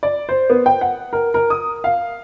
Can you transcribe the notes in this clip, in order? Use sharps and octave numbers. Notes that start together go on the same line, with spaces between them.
D5
C5
B3
G5
F#5
A#4
A#4
D#6
F5